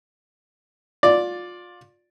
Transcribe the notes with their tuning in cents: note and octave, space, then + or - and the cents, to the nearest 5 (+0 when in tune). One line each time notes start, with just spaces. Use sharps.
F4 +25 D5 +0